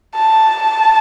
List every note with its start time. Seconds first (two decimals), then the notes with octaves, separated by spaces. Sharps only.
0.15 A5